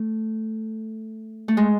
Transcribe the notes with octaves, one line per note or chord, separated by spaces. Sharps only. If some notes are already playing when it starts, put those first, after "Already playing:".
Already playing: A3
A3
G#3